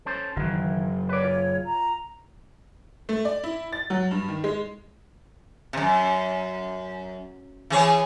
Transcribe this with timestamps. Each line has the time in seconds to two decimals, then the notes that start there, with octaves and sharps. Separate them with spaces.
0.06 C#4 A4 C5
0.36 F#1 D#3 E3
1.09 B4 C#5 D5
1.24 F4
1.65 A#5
3.09 A3
3.25 D5
3.44 E4
3.73 A6
3.90 F#3
4.11 G2
4.28 D#3
4.44 G#3
5.73 F#2 C3
7.70 E3 G#4 C#5